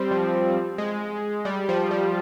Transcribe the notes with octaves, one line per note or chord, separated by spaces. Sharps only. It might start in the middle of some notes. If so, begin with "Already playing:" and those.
Already playing: G3 C4
F3
G#3
G3
F3
G3